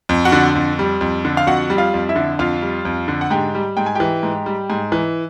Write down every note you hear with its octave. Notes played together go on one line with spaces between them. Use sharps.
F2
F#4 F#5
D3
F2
G3
F2
D3
F5
F2 F#4 F#5
G3
F4 F5
F2
E4 E5
D3
F2 F4 F5
G3
F2
D3
F#5
G#2 G4 G5
G3
G#2 G5
G#5
E3 G4 G5
G#2
G3
G#2
E3